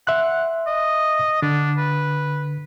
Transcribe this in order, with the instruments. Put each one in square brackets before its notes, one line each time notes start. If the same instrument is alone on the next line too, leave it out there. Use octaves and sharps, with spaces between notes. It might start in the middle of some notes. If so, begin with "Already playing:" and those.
[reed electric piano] E5 C6 F#6 [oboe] F#5
[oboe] D#5
[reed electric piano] D3 [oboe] D4
[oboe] B4